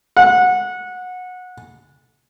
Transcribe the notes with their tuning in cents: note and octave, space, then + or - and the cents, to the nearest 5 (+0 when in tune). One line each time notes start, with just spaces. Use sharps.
F#5 -20